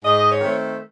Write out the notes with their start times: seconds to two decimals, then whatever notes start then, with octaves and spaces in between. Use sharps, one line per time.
0.05 G#2 D#5
0.29 C#5
0.41 D#3 A3 C4